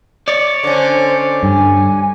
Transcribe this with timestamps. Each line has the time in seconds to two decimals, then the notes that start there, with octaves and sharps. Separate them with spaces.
0.28 C#5 D5
0.63 D3 C#4 C5
1.43 G2 G#5